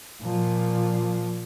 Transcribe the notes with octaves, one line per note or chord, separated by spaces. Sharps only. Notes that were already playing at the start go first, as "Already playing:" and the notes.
A#2 F3